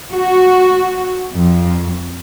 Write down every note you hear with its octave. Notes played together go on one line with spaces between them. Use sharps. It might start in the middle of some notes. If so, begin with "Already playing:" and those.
F#4
F2